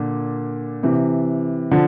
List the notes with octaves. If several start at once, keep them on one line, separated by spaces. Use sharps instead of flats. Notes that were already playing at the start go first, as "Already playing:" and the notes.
Already playing: A#2 D3
C3 E3
D3 F3